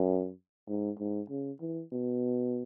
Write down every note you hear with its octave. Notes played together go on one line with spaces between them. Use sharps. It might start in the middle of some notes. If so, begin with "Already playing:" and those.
Already playing: F#2
G#2
G#2
C#3
E3
B2